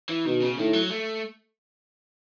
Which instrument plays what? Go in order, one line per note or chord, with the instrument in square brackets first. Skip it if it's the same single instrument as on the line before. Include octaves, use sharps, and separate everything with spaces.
[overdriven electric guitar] E3
[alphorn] B2 [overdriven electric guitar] D#3
[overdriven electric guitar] C#3
[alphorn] A2 [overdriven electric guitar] D#3
[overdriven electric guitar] F#3
A3